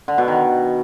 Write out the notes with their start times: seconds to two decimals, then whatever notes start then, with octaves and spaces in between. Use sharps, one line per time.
0.08 D3
0.18 B2
0.28 D#3